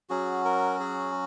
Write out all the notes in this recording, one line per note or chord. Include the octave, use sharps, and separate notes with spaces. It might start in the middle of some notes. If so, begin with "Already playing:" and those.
F#3 C#4 F#4 G#4
A#4
G#4